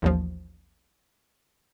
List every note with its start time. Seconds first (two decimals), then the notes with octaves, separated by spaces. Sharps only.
0.02 A1 D#2 F3